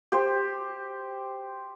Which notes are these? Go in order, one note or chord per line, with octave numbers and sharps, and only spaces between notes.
G4 C5